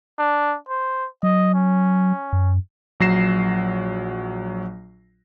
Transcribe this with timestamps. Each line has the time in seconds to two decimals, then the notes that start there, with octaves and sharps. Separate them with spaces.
0.19 D4
0.69 C5
1.23 F#3 D#5
1.54 C#4
2.33 F#2
3.00 A#1 F#3 A#6 C7 E7